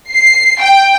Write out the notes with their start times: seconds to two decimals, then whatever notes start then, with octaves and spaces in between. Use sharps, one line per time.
0.11 C7
0.60 G5